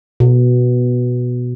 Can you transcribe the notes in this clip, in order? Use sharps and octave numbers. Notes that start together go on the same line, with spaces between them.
B2